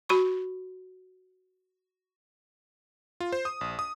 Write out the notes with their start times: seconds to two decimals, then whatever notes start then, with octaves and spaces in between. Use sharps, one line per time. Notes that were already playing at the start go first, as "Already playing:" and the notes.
0.09 F#4 B5 C#6
3.20 F4
3.32 C5
3.45 D#6
3.61 A#1
3.79 D#6